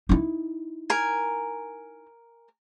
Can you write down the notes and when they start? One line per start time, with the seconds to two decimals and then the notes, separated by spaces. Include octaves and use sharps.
0.09 D#4 E4
0.90 A#4 G#5